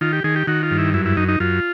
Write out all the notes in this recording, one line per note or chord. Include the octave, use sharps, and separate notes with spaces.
D#3 F4
G4
D#3 G#4
G4
D#3 F#4
F4
G2
E4
F#2 E4
E4
F#2 D#4
D#4
F#2 F4